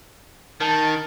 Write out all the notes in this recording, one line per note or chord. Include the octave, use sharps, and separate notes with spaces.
D#3 A5